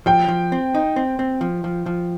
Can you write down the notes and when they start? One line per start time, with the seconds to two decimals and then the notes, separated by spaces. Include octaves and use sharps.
0.06 F3 G5
0.28 F3
0.52 C4
0.74 D#4
0.96 C4
1.19 C4
1.41 F3
1.64 F3
1.86 F3